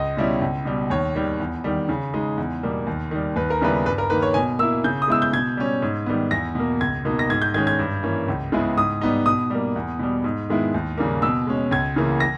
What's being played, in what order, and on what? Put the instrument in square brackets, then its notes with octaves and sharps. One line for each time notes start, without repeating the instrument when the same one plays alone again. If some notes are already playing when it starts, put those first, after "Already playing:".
Already playing: [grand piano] C#2 D#5
B2 G3 C#4 E4
C#2
B2 G3
D#2 C#5
D#3 G3
E2
D#3 G3
C#3
G#3 D#4
E2
B2 G3 A#3
D#2
D#3 G3
D#2 B4
A#4
C#3 G3 B3 E4 B4
G2 B4
A#4
D#3 A#3 B4
C#5
B2 G#5
A#3 E6
E4
C#3 G6
D#6
G#3 B3 E4 E6
G6
B2 G#6
G3 C#4
G#2
D#3 G3 B3
E2 A#6
B2 A#3
C#2 G#6
B2 A#3 D#4
A#6
G#2 G#6
G6
D#3 G#3 C#4 G#6
G#6
G2
E3 A#3 C#4
C#2
C#3 G#3 B3 E4
G#2 D#6
G3 B3 D#4
B2 D#6
G3 A#3
E2
B2 G3
G#2
D#3 G#3 B3 E4
D#2
C#3 G3 A#3
B2 E6
G#3 C#4
C#2 G#6
C#3 E3 A#3
A#6